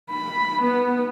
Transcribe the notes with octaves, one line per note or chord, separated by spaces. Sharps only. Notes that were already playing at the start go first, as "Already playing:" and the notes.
B5
B3